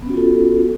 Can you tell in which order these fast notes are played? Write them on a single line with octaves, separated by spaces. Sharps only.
B3 C#4 F#4 F4 A4